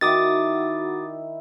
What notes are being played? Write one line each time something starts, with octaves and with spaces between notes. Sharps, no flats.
D#3 E4 F#4 D6 D#6 A6